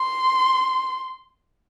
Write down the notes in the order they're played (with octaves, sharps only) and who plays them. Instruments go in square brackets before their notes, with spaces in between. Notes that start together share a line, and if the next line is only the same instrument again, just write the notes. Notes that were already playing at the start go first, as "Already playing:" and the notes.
Already playing: [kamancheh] C6